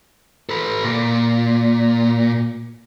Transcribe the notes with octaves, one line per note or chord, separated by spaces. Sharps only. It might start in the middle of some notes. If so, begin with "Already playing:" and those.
A4 B4
A#2